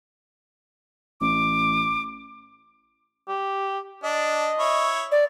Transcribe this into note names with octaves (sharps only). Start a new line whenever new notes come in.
A1 D6
G4
D4 D#5
E4 C#5
D5